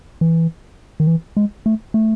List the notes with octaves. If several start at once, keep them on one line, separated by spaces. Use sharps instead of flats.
E3
D#3
E3
G#3
A3
A3